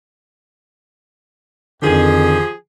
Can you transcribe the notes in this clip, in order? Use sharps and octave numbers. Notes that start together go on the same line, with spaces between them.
F2 D3 D#3 F3 G4 G#4